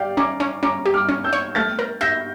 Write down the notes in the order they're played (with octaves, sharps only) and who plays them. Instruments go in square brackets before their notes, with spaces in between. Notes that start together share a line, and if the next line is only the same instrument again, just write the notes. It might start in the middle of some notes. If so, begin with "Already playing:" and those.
Already playing: [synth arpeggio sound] G4 [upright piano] D5 F5 G5
[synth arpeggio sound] C#4 [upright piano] A#5 D6
[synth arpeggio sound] C#4
[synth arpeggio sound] C#4 [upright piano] A#5 D6
[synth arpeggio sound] G4
[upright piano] D6 F6
[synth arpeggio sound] C#4
[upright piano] E6 G6
[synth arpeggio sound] C#5
[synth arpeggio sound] A3 [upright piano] F6 A6
[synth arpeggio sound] A#4
[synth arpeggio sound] E5 [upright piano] G6 A#6